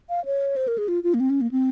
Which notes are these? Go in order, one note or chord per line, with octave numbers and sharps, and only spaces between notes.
F5
C#5
C5
A#4
G#4
F4
F4
A#3
C4
C#4
A#3
C4